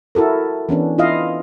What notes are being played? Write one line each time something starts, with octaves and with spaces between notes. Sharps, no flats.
E4 F#4 A4 A#4
E3 B3 C#4 D4
E4 F4 D#5 F5